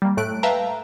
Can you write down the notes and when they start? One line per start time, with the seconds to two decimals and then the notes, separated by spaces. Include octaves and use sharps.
0.02 G3 A#3
0.17 A2 A3 F#6 D7
0.43 B4 E5 F5 G5 A5 A#5